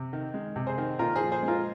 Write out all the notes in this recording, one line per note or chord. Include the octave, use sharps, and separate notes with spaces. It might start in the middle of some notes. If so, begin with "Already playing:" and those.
Already playing: C3
D#3
G#3
C3
G#4 C5
D#3
A#2 F4 A#4
G#4 C5
F3
G#4 C5
G#3
F4 A#4